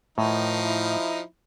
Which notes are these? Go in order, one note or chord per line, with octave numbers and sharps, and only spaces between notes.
A2 D#3 F3 D#4
E4